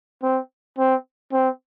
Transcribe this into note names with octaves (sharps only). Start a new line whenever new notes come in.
C4
C4
C4